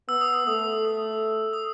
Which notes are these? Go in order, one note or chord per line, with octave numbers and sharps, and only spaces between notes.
B3 E6
D#6
E6
A3 D#6
D#6
D#6
D#6